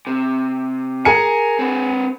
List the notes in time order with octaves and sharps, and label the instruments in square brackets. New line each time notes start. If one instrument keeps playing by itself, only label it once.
[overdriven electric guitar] C3
[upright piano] G#4 G#5 C#7 [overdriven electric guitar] A#4
[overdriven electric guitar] C4 B4